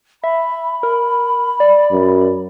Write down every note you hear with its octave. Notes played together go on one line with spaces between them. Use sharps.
E5 B5
A#4
D5
F#2